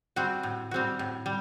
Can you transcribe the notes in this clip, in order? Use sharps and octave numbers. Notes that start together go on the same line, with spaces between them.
G3 C4 F#4
A2
G3 C4 F#4
A2
G3